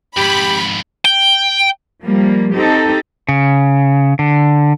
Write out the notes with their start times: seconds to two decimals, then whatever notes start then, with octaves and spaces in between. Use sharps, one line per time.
0.17 F2 G#2 G4 B5
1.05 G5
2.03 F3 G3 A#3
2.54 C4 D#4 G4 A4
3.29 C#3
4.19 D3